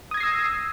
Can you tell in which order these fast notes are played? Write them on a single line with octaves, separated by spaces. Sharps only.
D#6 G#6 A#6 C7 E6